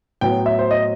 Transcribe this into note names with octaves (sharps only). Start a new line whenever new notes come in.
A2 F#3 B3 G5
E5
C5
D#5